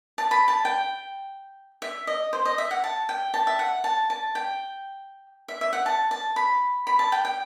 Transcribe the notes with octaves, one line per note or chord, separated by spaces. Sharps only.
A5
B5
A5
G5
E5
D#5
C5
D#5
E5
F#5
A5
G5
A5
E5
F#5
A5
A5
G5
E5
E5
F#5
A5
A5
B5
B5
A5
G5
G5